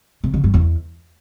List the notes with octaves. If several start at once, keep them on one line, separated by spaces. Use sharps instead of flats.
C3
D3
G2
E2